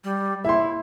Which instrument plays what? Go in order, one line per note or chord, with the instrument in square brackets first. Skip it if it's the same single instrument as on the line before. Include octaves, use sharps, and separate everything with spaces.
[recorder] G3
[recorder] E4 [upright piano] E5 C6